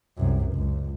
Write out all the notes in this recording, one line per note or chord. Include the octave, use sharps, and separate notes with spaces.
C2 F#2
C#2